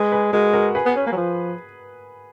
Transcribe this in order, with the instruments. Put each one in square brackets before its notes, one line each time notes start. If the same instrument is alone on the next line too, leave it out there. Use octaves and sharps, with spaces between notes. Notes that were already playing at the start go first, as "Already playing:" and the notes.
Already playing: [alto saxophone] G#3 [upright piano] G#4 B4
[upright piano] G#4 B4
[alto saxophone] G#3 [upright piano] F#4 A#4
[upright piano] F#4 A#4
G#4 B4
[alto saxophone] B3
C#4
A#3
F#3
F3